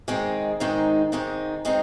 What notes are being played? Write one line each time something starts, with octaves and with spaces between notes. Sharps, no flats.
G#2 D#3 G#3 C4 D#4
G#2 D#3 G#3 C4 D#4
G#2 D#3 G#3 C4 D#4
D#3 G#3 C4 D#4